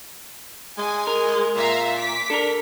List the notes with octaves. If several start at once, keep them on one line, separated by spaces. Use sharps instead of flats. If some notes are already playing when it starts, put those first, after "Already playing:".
G#3 G#5
A#4
A#2 E5 F5 A#5
D6 B6
D4 A4 A#4